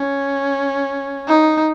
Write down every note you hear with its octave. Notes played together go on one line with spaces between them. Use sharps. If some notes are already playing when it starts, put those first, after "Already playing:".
Already playing: C#4
D#4